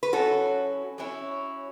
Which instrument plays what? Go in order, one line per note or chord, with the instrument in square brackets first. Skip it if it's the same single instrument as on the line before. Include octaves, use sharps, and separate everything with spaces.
[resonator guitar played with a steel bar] B4
[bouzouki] F#3 C#4 E4 [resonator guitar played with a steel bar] F#4 A4
[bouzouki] F#3 C#4 E4